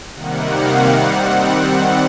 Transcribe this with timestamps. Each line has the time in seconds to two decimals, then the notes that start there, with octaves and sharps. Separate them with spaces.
0.14 C3 D#3 G3 A#3 F#5
0.52 F5
0.88 D#3 G3 C4 F#5